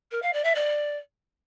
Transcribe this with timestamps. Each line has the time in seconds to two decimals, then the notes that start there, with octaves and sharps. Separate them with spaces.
0.11 A#4
0.22 F5
0.33 D5
0.44 E5
0.55 D5